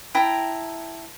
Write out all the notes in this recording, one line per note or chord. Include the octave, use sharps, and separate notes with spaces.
E4 G5 A5 A#5